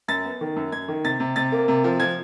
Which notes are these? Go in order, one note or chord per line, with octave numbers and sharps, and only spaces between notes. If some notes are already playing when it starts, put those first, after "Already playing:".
F#2 A6
B3
D#3
F#2
F#2 G#6
D#3
C3 A6
C3
C3 A6
A#3
C3
F3
F3 G#6